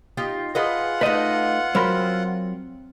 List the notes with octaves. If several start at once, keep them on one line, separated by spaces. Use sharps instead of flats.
D#4 F4 G4
F4 G#4 B4 D#5 F#5
A3 D#4 B4 D#5
F#3 C4 A#4 B5